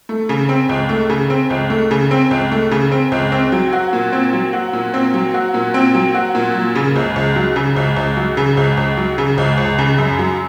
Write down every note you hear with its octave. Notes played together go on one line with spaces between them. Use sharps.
A3
C#3
C4
C#2
A3
C#3
C4
C#2
A3
C#3
C4
C#2
A3
C#3
C4
C#2
C4
F#3
F#4
A#2
C4
F#3
F#4
A#2
C4
F#3
F#4
A#2
C4
F#3
F#4
A#2
F#3
C#3
C#2
C#2
F#3
C#3
C#2
C#2
F#3
C#3
C#2
C#2
F#3
C#3
C#2
C#2
C#3
F#2
F#3